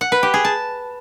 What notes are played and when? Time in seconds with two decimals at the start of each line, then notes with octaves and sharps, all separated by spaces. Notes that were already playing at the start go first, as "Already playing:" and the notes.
0.01 F#5
0.12 B4
0.23 G4
0.34 G#4
0.45 A5